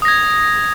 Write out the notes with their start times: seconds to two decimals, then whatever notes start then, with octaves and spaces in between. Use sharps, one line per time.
0.02 D#6
0.05 A#6
0.08 G#6